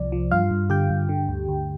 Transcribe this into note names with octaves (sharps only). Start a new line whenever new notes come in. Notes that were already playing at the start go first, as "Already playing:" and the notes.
Already playing: C2 C3 F3 D5
F3
G2 F4 F5
G2
D3 G4 G5
G2
D3
D2
D2